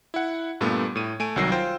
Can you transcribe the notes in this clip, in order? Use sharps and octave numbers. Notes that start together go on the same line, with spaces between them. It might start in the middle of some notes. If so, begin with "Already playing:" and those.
E4 F#5
G2 A#2 A3 B3
A2 D#7
A3 G#5 D7 D#7
C2 D#3 F#3 E6 A#6 C7
F4 C5 G5